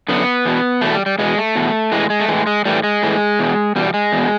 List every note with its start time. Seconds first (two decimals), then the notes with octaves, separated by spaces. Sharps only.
0.08 F#2 D3 B3
0.45 E2 B2
0.81 E2 B2 A3
0.94 G3
1.06 G3
1.19 E2 B2 G#3
1.37 A3
1.55 E2 B2
1.92 A2 E3 G#3
2.10 G#3
2.20 A3
2.28 A2 E3 G#3
2.47 G#3
2.65 A2 E3 G3
2.84 G#3
3.03 A2 E3
3.39 E2 B2
3.76 E2 B2 G3
3.94 G#3
4.13 E2 B2